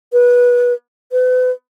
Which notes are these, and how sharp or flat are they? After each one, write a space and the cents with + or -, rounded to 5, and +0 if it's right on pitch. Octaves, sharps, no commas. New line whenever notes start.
B4 -20
B4 +40